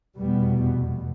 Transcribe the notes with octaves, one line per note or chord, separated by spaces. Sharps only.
F1 E2 B2 G3 B3